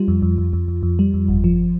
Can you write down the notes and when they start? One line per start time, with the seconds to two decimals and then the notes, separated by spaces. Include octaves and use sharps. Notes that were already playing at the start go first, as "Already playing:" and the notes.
Already playing: G3 F4
0.08 F2
0.22 F2
0.38 F2
0.53 F2
0.68 F2
0.83 F2
0.99 G3
1.14 F2
1.29 G1
1.44 F3